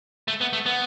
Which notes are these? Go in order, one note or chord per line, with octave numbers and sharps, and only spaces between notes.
A3
B3
A3
B3